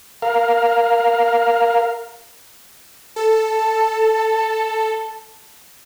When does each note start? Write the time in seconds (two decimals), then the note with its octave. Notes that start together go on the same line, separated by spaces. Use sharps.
0.22 A#4 F5
3.16 A4 A5